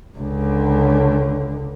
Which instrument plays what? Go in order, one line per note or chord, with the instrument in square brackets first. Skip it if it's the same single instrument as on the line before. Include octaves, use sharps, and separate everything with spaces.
[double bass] C#2 D3